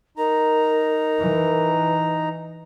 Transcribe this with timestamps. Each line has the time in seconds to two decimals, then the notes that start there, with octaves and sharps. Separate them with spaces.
0.17 D#4 A#4 A#5
1.20 E3